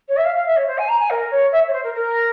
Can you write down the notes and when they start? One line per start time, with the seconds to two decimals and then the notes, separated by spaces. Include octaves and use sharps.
0.08 C#5
0.17 E5
0.25 F5
0.35 F5
0.46 E5
0.56 C#5
0.67 C5
0.78 G#5
0.88 A#5
0.99 G#5
1.10 A#4
1.31 C#5
1.52 E5
1.67 C#5
1.73 C5
1.83 A#4
1.94 A#4